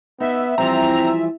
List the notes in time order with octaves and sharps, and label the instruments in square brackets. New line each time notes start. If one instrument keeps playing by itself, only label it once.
[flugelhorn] B3 [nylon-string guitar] D#4 [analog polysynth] E5
[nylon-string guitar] E3 F3 G3 [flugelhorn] C4 [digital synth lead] A#5